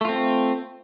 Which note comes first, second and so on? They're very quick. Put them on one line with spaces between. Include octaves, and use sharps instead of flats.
A3 F4 C4